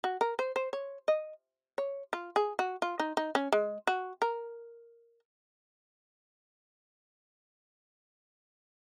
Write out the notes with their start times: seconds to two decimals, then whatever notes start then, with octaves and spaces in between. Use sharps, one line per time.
0.04 F#4
0.21 A#4
0.39 C5
0.56 C5
0.73 C#5
1.08 D#5
1.78 C#5
2.13 F4
2.36 G#4
2.59 F#4
2.82 F4
2.99 D#4
3.17 D#4
3.35 C#4
3.52 G#3
3.87 F#4
4.22 A#4